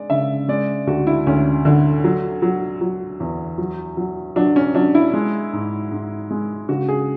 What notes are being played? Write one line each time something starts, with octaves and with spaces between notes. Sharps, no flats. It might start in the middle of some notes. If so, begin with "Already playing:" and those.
Already playing: G#3 D5
C#3 E5
G#3 D5
D2 F#4
E4
D2 C#4
D3
F#3
F#3
F#3
E2
F#3
F#3
F#3 D4
C#4
F#3 D4
E4
G#3
G#2
G#2
G#3
C#3 F#4
G#4